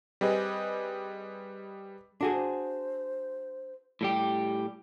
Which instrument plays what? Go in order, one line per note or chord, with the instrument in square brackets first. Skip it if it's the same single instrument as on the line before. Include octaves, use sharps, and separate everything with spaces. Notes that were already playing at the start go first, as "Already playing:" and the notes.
[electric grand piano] G3 C4 G4 G#4 B4 D#5
[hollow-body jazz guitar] D4 F#4 G#4 [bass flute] A4
[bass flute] C5
[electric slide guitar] A2 G3 G4